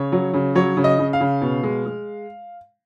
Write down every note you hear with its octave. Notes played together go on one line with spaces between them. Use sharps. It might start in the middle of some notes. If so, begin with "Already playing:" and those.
Already playing: C#3 C#5
F#3
C#3
F#3 C#5
C#3
D#5
C#3
F5
C#3
B2
G#3
G#3